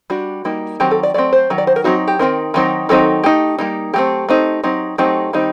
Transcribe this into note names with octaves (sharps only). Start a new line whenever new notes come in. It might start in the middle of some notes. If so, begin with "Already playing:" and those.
G3 D4 F#4
G3 A#3 D#4
D#3 F#3 C4 G4
A4
D5
F#3 A3 C4 D5
C5
D#3 F#3
D5
C5
A#4
F#3 C4 D#4 F#4
G4
D#3 G3 C4 D#4 A#4
D#3 F#3 C4 D#4
D#3 F#3 C4 D#4 A4
A3 D#4 G4
G3 A#3 D#4
F#3 A3 C4 G4
A3 C4 D#4
F#3 C4 D#4
F#3 A3 C4 D#4 G4
D#3 G3 C4 D#4